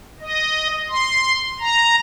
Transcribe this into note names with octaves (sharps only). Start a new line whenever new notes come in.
D#5
C6
A#5